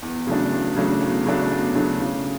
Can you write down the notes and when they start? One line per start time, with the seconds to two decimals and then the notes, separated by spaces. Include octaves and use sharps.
0.02 E2
0.27 C#3 F#3 A3 D4
0.52 E2
0.76 C#3 F#3 A3 D4
1.01 E2
1.26 C#3 F#3 A3 D4
1.51 E2
1.75 C#3 F#3 A3 D4
2.00 C#3